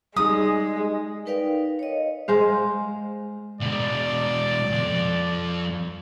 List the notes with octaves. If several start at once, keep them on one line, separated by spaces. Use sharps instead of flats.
G3 G#3 D#4 G#4 D#6
D#4 A#4 B4 D5 F5 G5
C#5 D#5
G#3 C5 F5
B2 G#3 D5
C2 F2